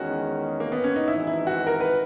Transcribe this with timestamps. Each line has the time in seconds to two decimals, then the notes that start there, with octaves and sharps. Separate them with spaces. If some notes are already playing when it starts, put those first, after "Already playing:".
Already playing: E2 D#3 G#3 C#4 F#4
0.60 A#3
0.72 B3
0.84 C#4
0.96 D#4
1.07 G#1 G#2 E3 E4
1.27 E4
1.47 F#4
1.67 A#4
1.81 B4